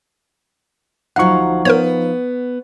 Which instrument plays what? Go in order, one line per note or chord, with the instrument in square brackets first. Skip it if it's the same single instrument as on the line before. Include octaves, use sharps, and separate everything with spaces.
[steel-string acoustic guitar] D2 F#3 [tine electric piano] F3 D#4 F5 [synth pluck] F#5 C#6
[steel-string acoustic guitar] B3 [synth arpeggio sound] A#4 C5 C#5